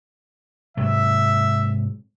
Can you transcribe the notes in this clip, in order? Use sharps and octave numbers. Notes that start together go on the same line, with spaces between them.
G#2 C3 F#3 E5